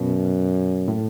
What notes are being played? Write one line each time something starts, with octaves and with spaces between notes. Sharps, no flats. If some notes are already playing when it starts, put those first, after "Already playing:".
Already playing: F#2 B2
A2